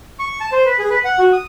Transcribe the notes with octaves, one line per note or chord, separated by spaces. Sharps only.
C#6
A5
C5
B4
G#4
B4
F#5
F#4
D#6